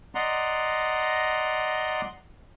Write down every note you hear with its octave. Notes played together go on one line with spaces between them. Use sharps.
D5 D#5 F#5 A#5 C6